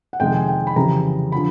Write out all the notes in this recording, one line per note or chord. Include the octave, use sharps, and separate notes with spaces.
F#5
F2 C3 D#3 G#3 G5
G#5
G5
B5
F2 C#3 E3 G3 A#5
D3 F3 B5